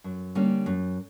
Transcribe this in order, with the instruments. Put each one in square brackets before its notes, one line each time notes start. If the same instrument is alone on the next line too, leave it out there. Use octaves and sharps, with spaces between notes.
[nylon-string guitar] F#2
D3 G3 A#3 C#4
F#2